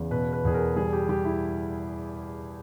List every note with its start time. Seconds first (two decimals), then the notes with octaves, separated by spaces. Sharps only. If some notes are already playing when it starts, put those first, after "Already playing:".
Already playing: E2 C#3
0.11 B2 B4
0.33 B4
0.44 E2 G#4
0.54 A#4
0.76 G3 G#4
0.93 G4
1.09 G3 G4
1.25 E4